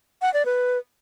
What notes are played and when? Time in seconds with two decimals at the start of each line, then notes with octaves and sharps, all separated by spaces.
0.22 F#5
0.34 D5
0.45 B4